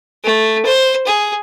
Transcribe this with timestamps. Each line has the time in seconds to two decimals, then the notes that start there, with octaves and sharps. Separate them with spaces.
0.24 A3
0.65 C5
1.07 G#4